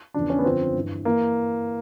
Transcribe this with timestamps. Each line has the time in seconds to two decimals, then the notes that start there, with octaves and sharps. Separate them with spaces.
0.14 E2 C#3 F3 D4
0.30 C#4
0.39 B3
0.45 F#2 D3 F3 C4
0.75 G2 E3
1.05 E3 A#3